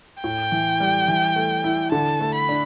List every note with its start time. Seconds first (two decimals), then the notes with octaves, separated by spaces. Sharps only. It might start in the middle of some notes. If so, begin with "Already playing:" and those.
0.23 A2 G5
0.52 E3
0.80 G3
1.08 E3
1.36 A3
1.64 E4
1.92 D3 A5
2.20 A3
2.35 B5
2.49 D4